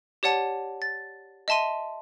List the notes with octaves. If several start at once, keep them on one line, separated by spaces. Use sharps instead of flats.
G4 C#5 D5 F#5 A5
A6
D#5 E5 A5 C6 D#7